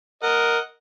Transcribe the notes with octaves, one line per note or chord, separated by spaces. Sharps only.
A#4 D#5 F#5